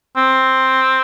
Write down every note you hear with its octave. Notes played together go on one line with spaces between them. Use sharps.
C4